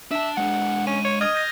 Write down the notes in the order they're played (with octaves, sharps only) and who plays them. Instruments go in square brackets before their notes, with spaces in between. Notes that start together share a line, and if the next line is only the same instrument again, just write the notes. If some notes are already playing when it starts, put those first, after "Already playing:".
[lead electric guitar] D4 A5 [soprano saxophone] E5
[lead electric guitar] G#3 D4 [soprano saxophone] F#5
[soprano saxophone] C#4 [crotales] D#7
[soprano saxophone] C#5
[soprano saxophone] D#5 [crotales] D#6 F6 G#6
[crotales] G6 A#6